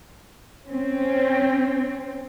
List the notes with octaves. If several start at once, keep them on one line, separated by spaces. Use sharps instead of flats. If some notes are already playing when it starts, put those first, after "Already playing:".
C4 C#4